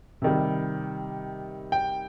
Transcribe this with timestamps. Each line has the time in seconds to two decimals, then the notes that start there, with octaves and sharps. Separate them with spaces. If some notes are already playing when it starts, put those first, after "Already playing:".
0.22 C3 D#3 G3
1.72 G5